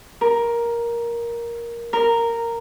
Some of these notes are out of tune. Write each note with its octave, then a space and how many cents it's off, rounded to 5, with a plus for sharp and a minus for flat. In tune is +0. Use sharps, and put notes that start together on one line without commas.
A#4 +10
A#4 -10